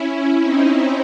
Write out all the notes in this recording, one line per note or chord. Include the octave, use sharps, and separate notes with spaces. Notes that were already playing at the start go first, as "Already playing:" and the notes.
Already playing: C#4 E4
C4 D#4